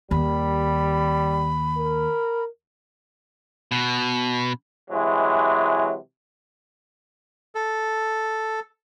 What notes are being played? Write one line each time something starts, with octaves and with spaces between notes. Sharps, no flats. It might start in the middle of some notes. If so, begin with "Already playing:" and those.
D#2 G3 B5
A#4
B2
C3 E3 F#3 G#3
A4